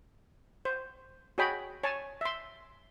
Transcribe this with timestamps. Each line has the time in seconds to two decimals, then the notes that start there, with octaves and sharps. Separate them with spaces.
0.65 C5
1.38 F#4 G#4 C#5 D#5 G5 B5
1.83 C#5 G#5 A5
2.21 E5 C6